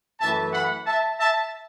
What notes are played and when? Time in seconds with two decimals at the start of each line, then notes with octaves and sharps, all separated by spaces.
0.20 F#2 E3 A3 E5 A5
0.53 F#5 B5
0.86 E5 A5
1.19 E5 A5